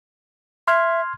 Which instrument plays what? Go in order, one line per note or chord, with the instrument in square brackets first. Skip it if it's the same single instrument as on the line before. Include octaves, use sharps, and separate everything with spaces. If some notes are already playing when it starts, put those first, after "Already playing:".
[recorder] E5 [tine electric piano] C6 F6 G#6